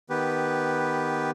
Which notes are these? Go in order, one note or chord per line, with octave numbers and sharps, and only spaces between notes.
D#3 B3 G4 B4